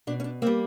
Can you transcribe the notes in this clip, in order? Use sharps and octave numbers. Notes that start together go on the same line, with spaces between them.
B2 D4
C#4
D4
G3 A#3 C4